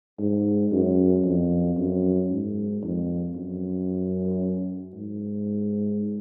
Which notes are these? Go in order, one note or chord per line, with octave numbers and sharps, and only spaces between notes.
G#2
F#2
F2
F#2
G#2
F2
F#2
G#2